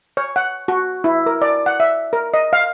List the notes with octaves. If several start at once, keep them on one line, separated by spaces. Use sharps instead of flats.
C#5
F#5
F#4
E4
A#4
D5
F#5
E5
A#4
D#5
F5